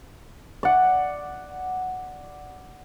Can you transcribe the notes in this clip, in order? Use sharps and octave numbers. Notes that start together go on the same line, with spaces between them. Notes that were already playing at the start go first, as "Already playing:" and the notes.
D5 F#5